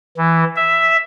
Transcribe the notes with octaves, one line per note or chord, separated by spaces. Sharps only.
E3
E5